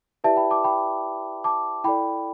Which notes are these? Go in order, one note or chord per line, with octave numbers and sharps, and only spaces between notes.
E4 G4 B4 D5 E5 A5
G5 B5
A5 D6
G5 B5
A5 D6
E4 A4 D5 G5 B5